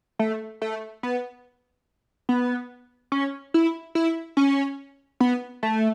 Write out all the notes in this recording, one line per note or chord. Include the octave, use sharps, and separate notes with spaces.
A3
A3
B3
B3
C#4
E4
E4
C#4
B3
A3